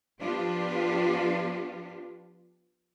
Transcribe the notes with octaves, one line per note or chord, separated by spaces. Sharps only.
F3 B3 D4 F4 G4